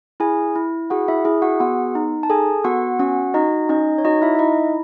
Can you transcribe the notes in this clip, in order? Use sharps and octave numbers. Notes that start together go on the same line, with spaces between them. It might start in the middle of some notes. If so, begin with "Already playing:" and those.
E4 G#4 G#5
E4
F#4 G#4 F#5
E4 E5
E4 G#4 E5
F#4 F#5
B3 F#4 F#5
D#4
A5
G#4 A4 G#5
B3 F#4 F#5
C#4 F#4 F#5
D#4 F#4 D#5
C#4 D#4 D#5
C#5
D#4 F#4 D#5
E4 E5
E5
D#4 E4 D#5